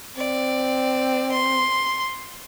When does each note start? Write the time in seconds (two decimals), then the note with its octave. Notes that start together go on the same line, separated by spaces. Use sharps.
0.17 C4 D5
1.32 C6